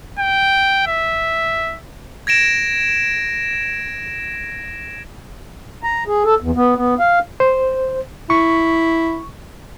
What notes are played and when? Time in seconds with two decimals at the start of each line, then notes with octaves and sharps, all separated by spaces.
0.19 G5
0.87 E5
2.27 G#6 A#6 D7 E7
5.83 A#5
6.07 G#4
6.25 A4
6.40 E2
6.56 B3
6.76 B3
7.00 F5
7.40 C5
8.30 E4 C#6